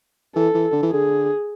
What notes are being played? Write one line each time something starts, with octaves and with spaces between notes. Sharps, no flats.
E3 A4
E3
D3
E3
D3 G#4